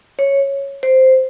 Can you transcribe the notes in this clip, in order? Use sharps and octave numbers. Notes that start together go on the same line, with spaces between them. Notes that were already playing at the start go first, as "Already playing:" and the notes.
C#5
C5